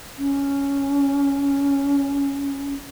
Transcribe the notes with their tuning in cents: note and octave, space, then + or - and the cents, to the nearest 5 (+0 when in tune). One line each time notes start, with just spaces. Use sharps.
C#4 +10